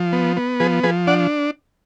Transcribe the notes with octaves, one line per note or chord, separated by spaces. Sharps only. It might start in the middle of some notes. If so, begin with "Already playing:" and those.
Already playing: F3
B3
B3
F3 G#4 B4
F3 G#4 B4
D4 D5 F#5